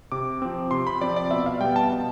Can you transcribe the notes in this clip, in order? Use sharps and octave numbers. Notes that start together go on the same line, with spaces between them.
C3 D6
F3 C4
C3 C6
B5
F3 C4 D5
D5
B2 E5
F5
G3 B3 G5
A5
B2